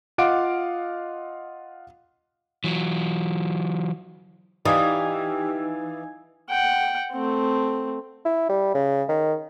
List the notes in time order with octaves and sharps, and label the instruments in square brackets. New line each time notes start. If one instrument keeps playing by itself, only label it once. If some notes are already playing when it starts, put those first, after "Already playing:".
[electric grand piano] F4 D#5 F5 F#5 D6 D7
[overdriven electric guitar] E3 F#3
[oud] E3 [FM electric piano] D#4 G#5 G#6 [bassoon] G4 [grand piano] D5 F5 D#6
[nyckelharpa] F#5 G5
A3 C4
[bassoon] E4
G3
C#3
D#3